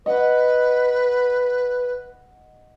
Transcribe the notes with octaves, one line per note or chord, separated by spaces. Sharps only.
B4 D#5 F#5